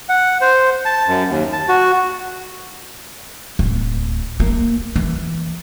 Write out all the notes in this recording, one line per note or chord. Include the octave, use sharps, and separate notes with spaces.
F#5
C5
A5
F#2
D#2
A5
F#4
D1
A#3
E3